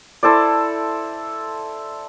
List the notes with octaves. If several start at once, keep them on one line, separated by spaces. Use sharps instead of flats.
E4 A4 C5 D5